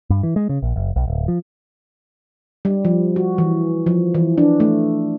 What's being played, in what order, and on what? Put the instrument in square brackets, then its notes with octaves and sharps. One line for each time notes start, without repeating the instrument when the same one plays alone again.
[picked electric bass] G2
E3
G#3
C#3
A#1
F#1
B1
D1
F3
[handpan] G3
F3
F#4
E3
F3
E3
D4
A3